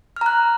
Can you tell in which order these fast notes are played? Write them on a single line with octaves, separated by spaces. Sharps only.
F6 A#5 F#6